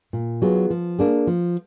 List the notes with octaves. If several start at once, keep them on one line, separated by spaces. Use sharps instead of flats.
A#2
F#3 B3 F4 G#4
F3
A#3 D4 G#4
F3